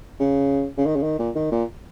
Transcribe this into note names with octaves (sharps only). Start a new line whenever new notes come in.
C#3
C#3
D#3
C#3
D#3
A#2
D#3
A#2